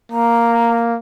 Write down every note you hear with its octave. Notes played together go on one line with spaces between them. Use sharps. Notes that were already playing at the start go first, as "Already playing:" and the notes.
A#3 A#5